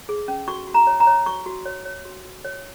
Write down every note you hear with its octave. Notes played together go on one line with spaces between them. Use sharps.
G#4
C#4
F#4 C#6
F#4
A#5
C#5
A#5
C#5
F#4 C#6
F#4
C#5
C#5
F#4
F#4
C#5